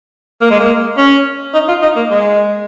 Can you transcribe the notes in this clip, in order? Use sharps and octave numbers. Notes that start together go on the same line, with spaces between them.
A#3
G#3
A#3
C#4
D#4
F4
D#4
A#3
G#3